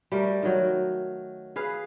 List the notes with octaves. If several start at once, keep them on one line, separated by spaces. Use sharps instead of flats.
G3 A3 A#4
D#3 F#3
G#4 B4 F5